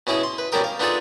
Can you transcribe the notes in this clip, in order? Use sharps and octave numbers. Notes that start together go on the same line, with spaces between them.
B2 C#4 E4 G#4
C6
B4
B2 G3 C#4 G4 A#4 D#6
F5
B3 D4 D#4 F4 G#4 A4